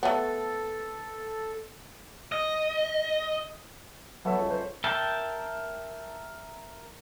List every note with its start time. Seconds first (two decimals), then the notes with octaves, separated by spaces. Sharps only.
0.03 A3 B3 A4
2.32 D#5
4.25 F#3 A3 B3 C#5 E5
4.38 C#2
4.50 B4 C5
4.84 A#4 E5 G5 A5